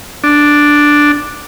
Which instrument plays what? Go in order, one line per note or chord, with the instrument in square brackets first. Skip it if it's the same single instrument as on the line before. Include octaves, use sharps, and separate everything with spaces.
[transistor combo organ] D4